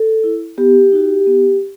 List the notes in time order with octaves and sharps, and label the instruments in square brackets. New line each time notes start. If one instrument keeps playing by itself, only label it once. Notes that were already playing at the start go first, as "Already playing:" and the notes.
Already playing: [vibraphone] A4
E4
B3 G4
D#4 F#4
B3